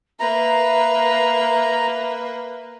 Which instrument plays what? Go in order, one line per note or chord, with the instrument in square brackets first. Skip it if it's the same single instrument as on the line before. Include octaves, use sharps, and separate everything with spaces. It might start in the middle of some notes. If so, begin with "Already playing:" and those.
[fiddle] A#3 B4 [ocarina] E5 [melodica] A#5